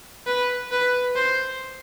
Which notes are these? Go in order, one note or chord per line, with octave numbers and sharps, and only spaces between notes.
B4
B4
C5